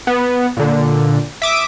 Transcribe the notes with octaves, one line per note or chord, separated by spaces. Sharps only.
B3
A#2 D3
E5 D6 D#6